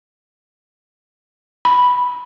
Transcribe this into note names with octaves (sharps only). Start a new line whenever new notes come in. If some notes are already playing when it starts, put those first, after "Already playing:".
B5